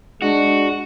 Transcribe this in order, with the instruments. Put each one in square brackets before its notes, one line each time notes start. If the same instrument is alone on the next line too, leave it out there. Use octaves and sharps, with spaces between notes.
[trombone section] G#3 D4 [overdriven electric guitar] F#4